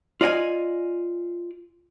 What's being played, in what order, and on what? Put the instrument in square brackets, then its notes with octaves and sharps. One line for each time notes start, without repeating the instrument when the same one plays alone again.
[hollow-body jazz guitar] F4 D5 D#5 F#5 G#5